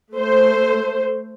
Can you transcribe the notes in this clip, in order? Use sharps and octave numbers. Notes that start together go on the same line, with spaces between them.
A3 C5